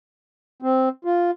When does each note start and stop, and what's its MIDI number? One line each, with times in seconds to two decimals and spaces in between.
0.62 0.89 60
1.05 1.31 65